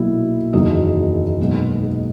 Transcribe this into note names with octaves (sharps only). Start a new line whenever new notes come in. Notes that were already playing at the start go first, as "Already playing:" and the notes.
Already playing: B1 A#2 F#3 E4 E5
F#1 E2 D#3 F#3 D#4 D#5
B1 A#2 G#3 B3
G#4